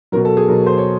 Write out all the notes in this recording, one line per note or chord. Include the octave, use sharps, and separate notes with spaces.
B2 F#3 A#4
A4
G#4
B2 F#3 A#4
C5
C#5